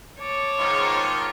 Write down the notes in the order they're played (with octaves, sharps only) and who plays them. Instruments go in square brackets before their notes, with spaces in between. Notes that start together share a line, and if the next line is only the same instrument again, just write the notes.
[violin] C#5 [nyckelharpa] A5 D6
[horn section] G#2 D#3 F4